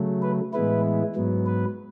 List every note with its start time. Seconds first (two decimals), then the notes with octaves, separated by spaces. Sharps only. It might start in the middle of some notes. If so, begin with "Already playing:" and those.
Already playing: C#3 F#3 A3
0.22 B4
0.53 A2 E3 G#3 B3 E4 B4
1.16 G#2 F#3 B3
1.47 B4